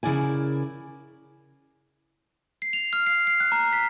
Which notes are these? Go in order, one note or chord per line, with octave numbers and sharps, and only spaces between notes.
C#3 E4 A#4 D5 G#5
C7
F7
F6
C7
C7
F#6
A#5
B6